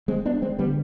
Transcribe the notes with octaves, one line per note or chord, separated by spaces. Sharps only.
G#3 C4
B3 D4
G#3 C4
D3 G3 B3